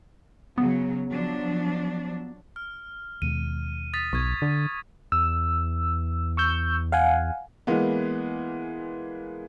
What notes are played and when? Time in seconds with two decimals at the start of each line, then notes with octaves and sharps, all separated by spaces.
0.58 C#3 F#3 B3
1.11 F3 F#3 D4
2.56 F6
3.22 D#2 B2 G#3 D#7
3.93 D#6 A6 B6
4.13 B1 C#6 G#6
4.42 D3
5.12 E2 E6
6.37 C#6 E6 G6
6.92 F5 F#5 G#5
7.67 E3 G#3 A#3 B3